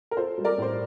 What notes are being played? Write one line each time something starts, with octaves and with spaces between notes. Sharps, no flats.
A#4
F4 A4 C5
G3
A#4 D5
A2 C5